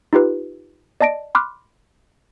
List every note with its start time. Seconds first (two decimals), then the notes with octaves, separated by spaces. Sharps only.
0.13 D#4 F4 G4 B4
1.01 D5 D#5 A5 A#6 D7
1.35 B5 C6 D6 F6 F#6